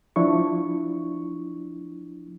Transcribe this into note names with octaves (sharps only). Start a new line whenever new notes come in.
F3 D4 E4 C#6